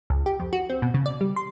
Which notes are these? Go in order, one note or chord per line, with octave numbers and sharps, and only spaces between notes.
C#2
G4
F2
F#4
C4
B2
C#3
D5
G3
C6